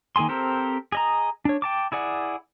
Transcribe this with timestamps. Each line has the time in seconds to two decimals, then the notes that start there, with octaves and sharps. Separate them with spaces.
0.16 D#3 A#3 G#4 G#5 C6
0.29 C4 G4 A4 A#4 C5
0.92 G#4 D#5 A#5
1.45 D4 C#5
1.62 G5 A5 D6
1.92 E4 G#4 D5 F#5